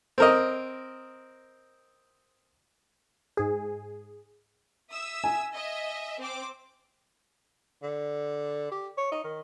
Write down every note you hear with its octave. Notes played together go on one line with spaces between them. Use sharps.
C4 A#4 D#5
G#2 G#4
E5 D#6 E6
G#5
D#5 E5
C4 C5 D6
D3
G4
C#5
D#4
D#3